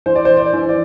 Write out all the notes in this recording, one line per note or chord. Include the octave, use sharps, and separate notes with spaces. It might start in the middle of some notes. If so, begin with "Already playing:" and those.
E3 C5
D5
C5
D5
E3
D5